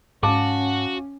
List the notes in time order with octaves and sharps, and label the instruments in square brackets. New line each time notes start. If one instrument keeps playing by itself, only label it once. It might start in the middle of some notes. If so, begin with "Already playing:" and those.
[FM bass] G#2 [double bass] C#4 [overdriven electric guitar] F#4 [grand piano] F5 A5 D6